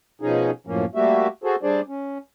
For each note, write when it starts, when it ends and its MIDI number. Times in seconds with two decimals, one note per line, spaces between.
0.22 0.51 47
0.22 0.51 53
0.22 0.51 61
0.22 0.51 63
0.22 0.51 68
0.67 0.85 42
0.67 0.85 45
0.67 0.85 53
0.67 0.85 58
0.67 0.85 61
0.95 1.27 55
0.95 1.27 57
0.95 1.27 58
0.95 1.27 66
0.95 1.27 67
0.95 1.27 76
1.44 1.56 66
1.44 1.56 68
1.44 1.56 69
1.44 1.56 72
1.63 1.81 55
1.63 1.81 62
1.63 1.81 68
1.63 1.81 72
1.63 1.81 74
1.88 2.18 61